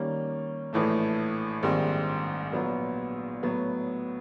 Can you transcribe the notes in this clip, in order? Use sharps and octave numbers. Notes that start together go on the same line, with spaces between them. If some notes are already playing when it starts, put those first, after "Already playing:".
Already playing: D#3 G3 A#3 C#4
A#1 A2 E3 A3
A#1 G#2 D#3 G3 C4
A#1 A#2 F#3 B3
A2 F#3 B3